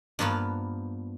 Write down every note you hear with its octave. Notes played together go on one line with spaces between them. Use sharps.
G2 F3 A#3 B3 F4